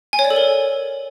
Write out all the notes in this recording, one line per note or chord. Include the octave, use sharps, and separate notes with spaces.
G#5
C#5
D5
A4
A#4